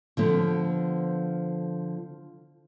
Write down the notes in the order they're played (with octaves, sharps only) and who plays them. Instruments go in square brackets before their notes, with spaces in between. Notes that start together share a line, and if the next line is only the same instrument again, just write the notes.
[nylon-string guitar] D3 F3 B3